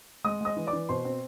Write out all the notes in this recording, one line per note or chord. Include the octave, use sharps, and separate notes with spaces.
G#3 D#5 D#6
G#3 D#5 D#6
E3
D5 D6
E3
B2 C5 C6
C4